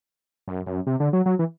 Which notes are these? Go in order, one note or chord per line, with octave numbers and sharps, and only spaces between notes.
F#2
F#2
C3
D3
F#3
F#3
E3